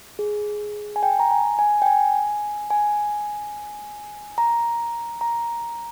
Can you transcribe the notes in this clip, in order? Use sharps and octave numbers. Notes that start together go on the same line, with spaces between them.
G#4
G#5
G5
A#5
G#5
G#5
G5
G#5
G#5
A#5
A#5